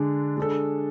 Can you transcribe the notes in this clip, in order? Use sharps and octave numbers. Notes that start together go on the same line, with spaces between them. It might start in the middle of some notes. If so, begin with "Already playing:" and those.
Already playing: D3 G#3 D4
G#3 D4 A4